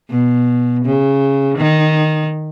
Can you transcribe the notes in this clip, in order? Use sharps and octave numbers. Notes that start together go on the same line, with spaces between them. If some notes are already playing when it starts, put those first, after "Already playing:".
B2
C#3
D#3